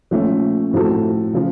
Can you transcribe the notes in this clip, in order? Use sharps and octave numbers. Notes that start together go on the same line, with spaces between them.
A#2 F3 A3 C#4
A2 F3 C4 F#4 A4
C#3 F3